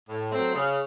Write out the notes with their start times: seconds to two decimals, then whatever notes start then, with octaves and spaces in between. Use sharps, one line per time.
0.09 A2
0.32 F#3 A3 C4
0.54 C#3